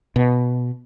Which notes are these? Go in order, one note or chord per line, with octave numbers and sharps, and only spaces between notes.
B2